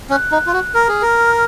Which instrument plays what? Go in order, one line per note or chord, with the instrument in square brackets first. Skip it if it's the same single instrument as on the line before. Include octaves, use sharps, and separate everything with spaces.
[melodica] C#4 [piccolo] F#6
[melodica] D#4
F4
F#4
[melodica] A#4 [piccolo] F6
[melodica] G#4
A#4